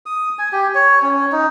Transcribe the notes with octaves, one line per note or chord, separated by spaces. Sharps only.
D#6
G#5
G4
C#5
C#4
D#4